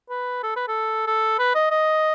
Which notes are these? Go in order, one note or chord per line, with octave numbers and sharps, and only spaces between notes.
B4
A4
B4
A4
A4
B4
D#5
D#5